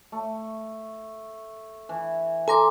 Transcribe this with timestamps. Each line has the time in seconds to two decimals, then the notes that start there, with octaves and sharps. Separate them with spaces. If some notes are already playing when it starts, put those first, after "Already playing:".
0.12 A3
1.89 E3
2.48 A4 G#5 A#5 C6 D6